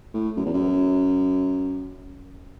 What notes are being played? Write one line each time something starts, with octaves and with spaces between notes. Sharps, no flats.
A2
F#2
E2
F#2